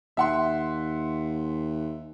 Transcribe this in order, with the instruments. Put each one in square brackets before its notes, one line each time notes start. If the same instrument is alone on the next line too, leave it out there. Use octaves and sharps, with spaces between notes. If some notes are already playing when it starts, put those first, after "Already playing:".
[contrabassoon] D#2 [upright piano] E5 F#5 C6